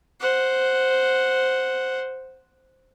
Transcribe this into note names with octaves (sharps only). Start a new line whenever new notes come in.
C5 F#5